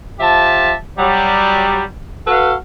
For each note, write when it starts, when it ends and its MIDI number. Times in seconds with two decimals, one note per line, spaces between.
0.20 0.73 53
0.20 0.73 67
0.20 0.73 76
0.20 0.73 81
0.98 1.81 54
0.98 1.81 55
2.27 2.53 66
2.27 2.53 69
2.27 2.53 71
2.27 2.53 77